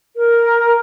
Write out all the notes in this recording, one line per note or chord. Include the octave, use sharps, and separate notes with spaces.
A#4